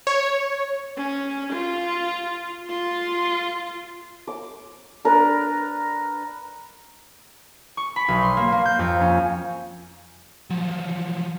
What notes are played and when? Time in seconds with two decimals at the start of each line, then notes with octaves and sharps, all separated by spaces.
0.07 C#5
0.97 C#4
1.53 F4
2.68 F4 C6
4.27 D6
5.05 D4 A#4 B4
7.77 C#6
7.96 B5
8.08 B1
8.22 C6
8.37 A#3
8.52 A#3
8.65 G6
8.79 F2
9.01 C#4
10.50 F3 F#3